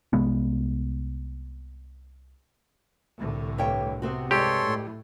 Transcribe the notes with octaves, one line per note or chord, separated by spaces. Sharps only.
C2 C3 G#3 B3
C2 A2 D3
G2 C#5 G5
C3 B3 C4 F#4
G2 G#3 G4 A4 C#5 C6
A2